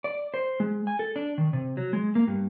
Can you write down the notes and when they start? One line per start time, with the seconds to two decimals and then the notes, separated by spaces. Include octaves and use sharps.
0.04 D5
0.34 C5
0.60 G#3
0.87 G#5
0.99 A4
1.16 D4
1.38 D#3
1.53 C3
1.77 F#3
1.93 G#3
2.15 A#3
2.27 G2